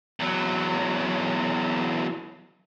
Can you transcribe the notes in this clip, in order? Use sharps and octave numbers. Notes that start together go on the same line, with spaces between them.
E2 F#3